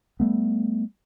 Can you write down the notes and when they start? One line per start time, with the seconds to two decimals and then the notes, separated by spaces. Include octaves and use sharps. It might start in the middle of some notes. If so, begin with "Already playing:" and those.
0.20 G3 A3 B3